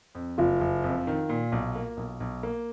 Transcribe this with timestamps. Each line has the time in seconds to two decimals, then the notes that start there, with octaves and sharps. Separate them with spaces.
0.15 F2
0.38 F#1 F4
0.61 F#1
0.84 F2
1.07 D#3
1.29 A#2
1.52 B1
1.76 A#3
1.97 B1
2.20 B1
2.43 A#3